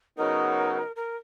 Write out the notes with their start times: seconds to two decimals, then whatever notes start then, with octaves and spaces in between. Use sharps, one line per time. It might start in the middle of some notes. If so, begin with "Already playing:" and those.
0.17 C#3 F#3 B3 D#4 A#4
0.96 A#4